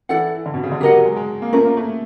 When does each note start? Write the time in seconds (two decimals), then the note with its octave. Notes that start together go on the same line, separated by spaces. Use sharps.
0.09 E3 E4 A4 D5 F#5
0.46 D3
0.54 B2
0.63 C#3
0.72 D3
0.81 F#3 G4 A#4 D#5 F#5
0.93 F#3
1.05 G#3
1.16 G#3
1.42 A#3
1.53 A3 C#4 F4 A#4
1.65 A#3
1.77 A3